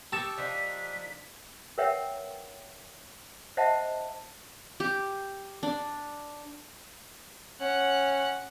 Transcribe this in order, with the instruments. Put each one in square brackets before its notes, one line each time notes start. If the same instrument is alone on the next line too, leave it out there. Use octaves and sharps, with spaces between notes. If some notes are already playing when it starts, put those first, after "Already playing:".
[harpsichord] G4 A4 C#6 [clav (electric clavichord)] A5 [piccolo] D#6
[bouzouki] F3 D4 D#4 [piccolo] B6
[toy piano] A#4 B4 C#5 E5 F#5 G5
C5 D#5 E5 F#5 A5
[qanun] G4
D4
[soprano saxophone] C#4 [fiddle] F#5